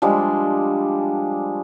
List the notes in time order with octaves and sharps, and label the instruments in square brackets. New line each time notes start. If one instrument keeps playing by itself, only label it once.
[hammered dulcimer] F3 G3 G#3 D4